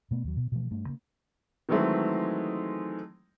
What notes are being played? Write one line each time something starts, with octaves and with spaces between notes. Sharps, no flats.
B2 A3 B3
D#2 F#3
B2
B2 E3 F3 A3
G2 A3
C#3 A#3
D#3 E3 F#3 G#3 A3 C4